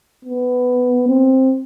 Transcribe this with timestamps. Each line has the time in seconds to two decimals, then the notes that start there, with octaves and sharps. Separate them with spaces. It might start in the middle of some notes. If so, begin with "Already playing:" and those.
0.25 B3
1.09 C4